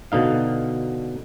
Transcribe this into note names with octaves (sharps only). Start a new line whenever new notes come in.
B2 D3 D#4 F5